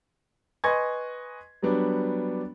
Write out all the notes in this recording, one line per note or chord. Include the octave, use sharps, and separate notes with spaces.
B4 D#5 G#5 C6 C#6 G#6
F#3 G3 B3 D4